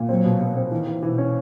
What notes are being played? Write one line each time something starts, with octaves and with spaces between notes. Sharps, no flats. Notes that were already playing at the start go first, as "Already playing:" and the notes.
Already playing: A#2
F#3 C4
B2
B2
C4
D#3 E3
E3
B2 E3
C#4